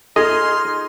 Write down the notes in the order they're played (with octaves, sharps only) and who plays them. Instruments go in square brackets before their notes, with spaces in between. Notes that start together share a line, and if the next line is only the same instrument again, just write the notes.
[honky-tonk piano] D#4 F4 G#4 [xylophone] A4 [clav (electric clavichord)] D#5 [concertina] C6 F6